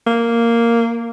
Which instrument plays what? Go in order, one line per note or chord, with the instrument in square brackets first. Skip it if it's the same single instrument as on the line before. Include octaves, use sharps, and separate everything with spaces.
[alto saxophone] A#3